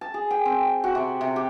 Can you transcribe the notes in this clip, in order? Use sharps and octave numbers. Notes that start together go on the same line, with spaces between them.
A5
G#4
G5
C4
F#4
C3
C3
G4